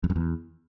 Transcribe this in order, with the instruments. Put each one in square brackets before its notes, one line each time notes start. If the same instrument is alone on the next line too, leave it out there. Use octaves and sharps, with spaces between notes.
[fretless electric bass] F2
F#2
E2